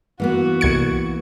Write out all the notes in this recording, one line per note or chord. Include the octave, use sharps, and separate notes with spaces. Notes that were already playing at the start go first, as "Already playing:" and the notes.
E3 A#3 B3 F#4
C2 G#6 C#7